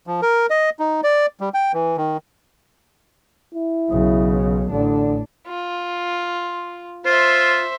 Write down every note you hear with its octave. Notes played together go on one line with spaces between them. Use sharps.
F3
A#4
D#5
D#4
D5
G3
G5
E3
D#3
E4
B1 C#3
A1 D3 D4
F4
F4 C5 E5